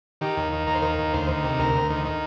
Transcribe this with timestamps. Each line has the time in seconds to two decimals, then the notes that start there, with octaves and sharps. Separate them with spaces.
0.21 D#3 G4
0.37 D#2
0.53 D#3
0.67 D#2 A#4
0.75 C5
0.82 D#3 A#4
0.98 D#2
1.13 D2 C5
1.29 D#3
1.44 C3
1.59 D2 A#4
1.74 D2
1.90 D#3
2.05 D#3